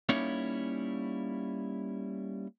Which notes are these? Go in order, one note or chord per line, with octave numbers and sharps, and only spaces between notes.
G3 A#3 C#4 D#4 E4 C#5